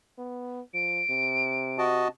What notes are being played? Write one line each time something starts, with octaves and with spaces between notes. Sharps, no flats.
B3
F3 D7
C3
F#4 D#5 A5